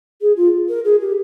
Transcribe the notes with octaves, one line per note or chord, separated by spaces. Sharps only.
G#4
F4
A#4
G#4
G4